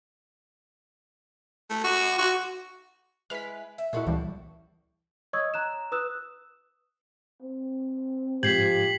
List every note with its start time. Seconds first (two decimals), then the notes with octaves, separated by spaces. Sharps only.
1.70 A3
1.84 F#4
2.18 F#4
3.30 G#3 E4 B4 F6 B6
3.78 E5
3.93 A#2 G#3 A3 E4 F#4
4.07 C#2 E3 F3 G3
5.33 C#5 D#5 C#6 D#6 E6 G#6
5.54 A#5 F#6 E7
5.92 B4 D#6 E6 F#6 E7
7.42 C4
8.43 G#2 F3 G4 G6 G#6 B6 C7 F#7